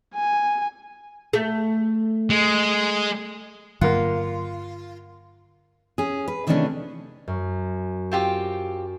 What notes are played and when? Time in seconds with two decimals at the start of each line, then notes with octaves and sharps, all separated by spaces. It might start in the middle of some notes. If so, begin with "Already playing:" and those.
0.15 G#5
1.33 A3
2.30 G#3
3.81 G2 D3 F#3 A#3 F4 A#4 F#5
5.98 C#4 G#4
6.28 B4
6.47 C3 D#3 E3 A3 C#4 D4
7.28 F#2
8.12 C4 F4 G4